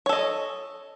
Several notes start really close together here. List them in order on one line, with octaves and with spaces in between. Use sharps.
C#5 A4 D#5